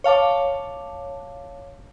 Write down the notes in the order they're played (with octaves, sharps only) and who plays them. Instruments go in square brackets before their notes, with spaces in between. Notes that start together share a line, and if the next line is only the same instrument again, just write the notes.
[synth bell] C#5 F5 A5 D6